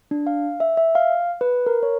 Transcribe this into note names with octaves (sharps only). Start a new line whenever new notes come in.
D4
F5
E5
E5
F5
B4
A#4
C#5